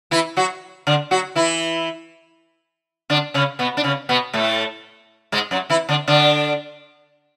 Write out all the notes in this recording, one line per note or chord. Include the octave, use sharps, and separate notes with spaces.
E3 E4
F#3 F#4
D3 D4
F#3 F#4
E3 E4
D3 D4
C#3 C#4
B2 B3
D4
C#3 C#4
B2 B3
A2 A3
G#2 G#3
F#2 F#3
E3 E4
D3 D4
D3 D4